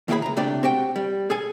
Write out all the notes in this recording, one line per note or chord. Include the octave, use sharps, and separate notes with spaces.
D#2 A#2 E4 G4 G#4 B5
C#2 A#5
C#2 C3 A3 D4 G4 D5
C4 F#4 G4 G5
G3
G#4 A4 G#5